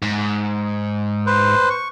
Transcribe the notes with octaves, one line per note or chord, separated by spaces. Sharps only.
G#2
B4 C5
C#6